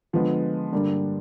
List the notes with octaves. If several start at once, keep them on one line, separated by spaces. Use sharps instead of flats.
D3 F3 G#3 B3
G2 D3 G3 A#3 D4